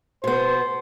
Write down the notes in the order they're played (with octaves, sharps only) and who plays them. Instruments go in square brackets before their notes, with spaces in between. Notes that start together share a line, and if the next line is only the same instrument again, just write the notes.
[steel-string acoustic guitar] B2 B3 [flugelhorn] C5